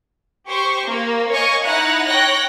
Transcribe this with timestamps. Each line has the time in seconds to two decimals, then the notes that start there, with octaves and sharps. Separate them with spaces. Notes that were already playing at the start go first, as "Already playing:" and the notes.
0.48 G4 C5 C#6
0.86 A#3
1.31 C#5 D#5 F5 G#5 C#6
1.64 D#4 E4 F#5 A#5 F#6
2.05 C#5 G5 F#6 A#6